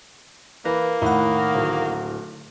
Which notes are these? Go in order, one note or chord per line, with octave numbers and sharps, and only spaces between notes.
E3 A#3 B4
A2 D#3 E4 F#5
D1